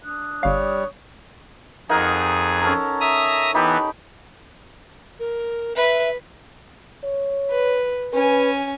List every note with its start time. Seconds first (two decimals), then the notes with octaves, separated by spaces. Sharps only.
0.04 D4 D#6 F#6
0.43 G1 G3 C#5 F5
1.89 F2 D#4 G#4 A#4 F#5
2.62 C#4 A4 A#4
3.00 E5 A#5 D#6
3.54 E3 B3 D#4 G4 B5
5.20 A#4
5.76 B4 E5
7.04 C#5
7.51 B4
8.14 C#4 B4 G#5